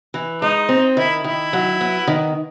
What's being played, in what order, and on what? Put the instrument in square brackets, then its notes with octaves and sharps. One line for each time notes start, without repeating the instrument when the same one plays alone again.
[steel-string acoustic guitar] E3
[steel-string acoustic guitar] G#3 [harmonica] D#4
[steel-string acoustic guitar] C4
[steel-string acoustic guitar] D#3 [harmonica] E4
[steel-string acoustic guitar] D#3 [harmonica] E4
[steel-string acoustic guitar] F#3
B3
D#3